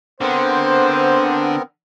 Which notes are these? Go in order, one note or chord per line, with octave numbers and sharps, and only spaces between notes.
D3 B3 C4 A#4 C5